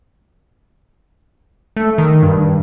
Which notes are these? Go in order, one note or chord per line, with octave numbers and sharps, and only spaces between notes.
A3
D#3
G2